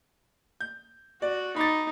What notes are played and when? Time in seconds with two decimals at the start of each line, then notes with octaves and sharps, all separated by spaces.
0.60 G6
1.22 F#4 D5
1.56 D#4 B5 D6 A6